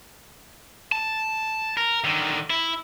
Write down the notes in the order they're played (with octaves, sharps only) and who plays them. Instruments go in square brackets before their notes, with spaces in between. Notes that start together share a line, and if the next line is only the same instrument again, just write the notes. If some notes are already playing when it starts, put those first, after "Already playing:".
[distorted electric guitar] A5
A#4
D3 D#3
E4